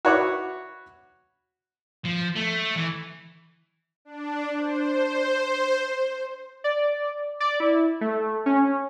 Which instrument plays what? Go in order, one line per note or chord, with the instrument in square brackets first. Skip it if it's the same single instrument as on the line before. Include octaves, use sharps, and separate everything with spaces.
[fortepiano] F#4 B4 C#5 E5 F#5 D6
[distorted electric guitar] F3
A3
E3
[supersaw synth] D4
C5
[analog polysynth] D5
D5
E4
A3
C#4